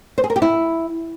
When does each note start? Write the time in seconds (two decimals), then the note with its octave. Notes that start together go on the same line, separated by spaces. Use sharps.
0.18 C5
0.24 G#4
0.30 A#4
0.36 G4
0.42 E4